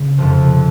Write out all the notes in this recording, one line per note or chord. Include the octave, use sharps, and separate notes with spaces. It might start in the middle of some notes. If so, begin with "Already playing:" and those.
Already playing: C#3
F2 C3 F3